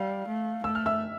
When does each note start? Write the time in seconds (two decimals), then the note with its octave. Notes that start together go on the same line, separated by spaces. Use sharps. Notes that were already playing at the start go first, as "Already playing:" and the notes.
Already playing: G3 F5
0.28 A3
0.64 A3 E6
0.75 F6
0.86 E5 E6